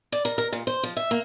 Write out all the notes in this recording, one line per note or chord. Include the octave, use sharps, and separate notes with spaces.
D5
A#4
A#4
A#2
C5
F3
E5
A#3